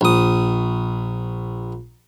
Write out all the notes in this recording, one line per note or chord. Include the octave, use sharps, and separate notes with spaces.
A#1 D#6